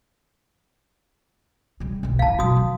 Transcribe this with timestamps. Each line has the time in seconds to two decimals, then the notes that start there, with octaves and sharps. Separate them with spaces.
1.80 C#3 G3
2.03 E1 B1
2.19 A#1 E4 F5 A5
2.39 B2 F#3 F#4 D#6
2.57 D#3